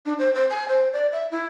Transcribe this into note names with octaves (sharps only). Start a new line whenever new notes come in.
D4
C5
C5
G#5
C5
D5
E5
E4